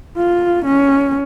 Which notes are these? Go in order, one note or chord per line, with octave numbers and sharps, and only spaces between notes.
F4
C#4